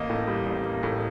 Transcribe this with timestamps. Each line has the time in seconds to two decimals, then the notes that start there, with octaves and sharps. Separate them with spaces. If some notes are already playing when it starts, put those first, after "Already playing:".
Already playing: A1 A#3 D#5
0.10 A2
0.28 G3
0.46 A1
0.64 A#3
0.83 A2